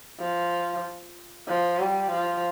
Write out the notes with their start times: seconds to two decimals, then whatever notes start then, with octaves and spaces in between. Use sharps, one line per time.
0.20 F3
1.48 F3
1.80 G3
2.12 F3